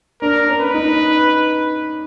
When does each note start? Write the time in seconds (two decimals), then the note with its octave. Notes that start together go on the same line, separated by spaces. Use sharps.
0.22 D4 A#4
0.48 C#4
0.61 B4
0.74 D#4